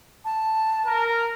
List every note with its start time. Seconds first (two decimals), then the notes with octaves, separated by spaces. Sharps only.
0.25 A5
0.86 A#4